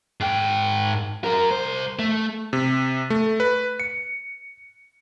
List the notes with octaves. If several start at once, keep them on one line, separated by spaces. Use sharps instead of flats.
G#2 G5
F#3 A#4
C2 C5
A3
C3
A3
B4
C#7